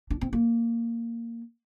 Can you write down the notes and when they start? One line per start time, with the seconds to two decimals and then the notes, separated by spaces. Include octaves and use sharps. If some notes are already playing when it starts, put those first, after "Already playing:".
0.10 D4
0.21 C4
0.33 A#3